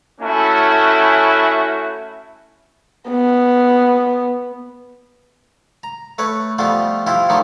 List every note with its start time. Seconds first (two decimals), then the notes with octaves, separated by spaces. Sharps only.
0.21 A3 C#4 E4 F#4
3.08 B3
5.83 A#5
6.18 A3 B4 C#5
6.58 F3 G3 A3 B3 F4
7.06 F3 E4 F4 G4
7.29 D3 D#3 F3 G3 A3 D#4